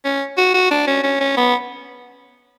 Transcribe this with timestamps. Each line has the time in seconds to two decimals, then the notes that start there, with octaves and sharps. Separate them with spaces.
0.05 C#4
0.38 F#4
0.54 F#4
0.71 D4
0.87 C#4
1.04 C#4
1.21 C#4
1.37 B3